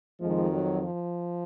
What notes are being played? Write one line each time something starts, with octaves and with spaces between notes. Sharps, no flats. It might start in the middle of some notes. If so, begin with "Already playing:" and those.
F2 D#3 F3 G#3
F#3
F3